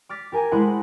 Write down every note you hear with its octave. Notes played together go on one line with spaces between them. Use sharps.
D6 F6 A6 B6
G4 A#4 G#5
G#3 A3 E4 C5 F#5 B5